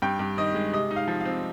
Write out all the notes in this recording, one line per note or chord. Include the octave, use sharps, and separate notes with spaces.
G2 G5
G2
D#3 D#5
G#3
C3 D#5
D#4
F5
F3
F5
C4